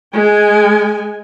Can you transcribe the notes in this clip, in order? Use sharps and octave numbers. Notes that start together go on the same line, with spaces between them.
G#3 G#5